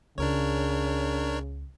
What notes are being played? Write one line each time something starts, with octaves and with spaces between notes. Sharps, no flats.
C#2 C#3 D4 A#4 C#5